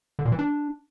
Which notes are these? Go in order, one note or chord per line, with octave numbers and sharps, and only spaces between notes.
D3
A#2
E3
D4